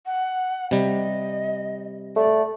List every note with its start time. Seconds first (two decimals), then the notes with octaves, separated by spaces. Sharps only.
0.06 F#5
0.71 C3 G3 D#5
2.16 A3 D5